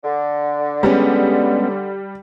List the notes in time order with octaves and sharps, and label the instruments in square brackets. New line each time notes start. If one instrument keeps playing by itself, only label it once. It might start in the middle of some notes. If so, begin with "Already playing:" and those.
[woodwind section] D3
[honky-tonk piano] G3 [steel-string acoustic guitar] G#3 B3 C#4